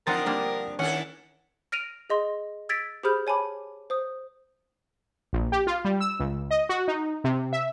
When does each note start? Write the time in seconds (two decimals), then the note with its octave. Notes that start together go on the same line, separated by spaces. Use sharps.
0.07 D3 F3 C4 D#4 F4 A#4 F#5 A6
0.26 G3 A#3 D4
0.79 D#3 C#4 E4 A4 C#5 F#5
1.72 F6 A#6 D7 D#7 F7
2.10 G#4 D#5 C6 A#6
2.69 E6 G#6 A6 B6 D7
3.03 G4 G#4 C5 B5 F6 G6
3.27 C#5 G#5 A5 B5 D6
3.90 C5 D#6
5.33 A#1
5.52 G4
5.67 F4
5.85 G3
6.00 E6
6.19 C#2
6.51 D#5
6.69 F#4
6.88 D#4
7.24 C3
7.53 E5